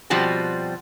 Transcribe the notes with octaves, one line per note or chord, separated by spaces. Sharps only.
B2 F3 G3 C4 F#4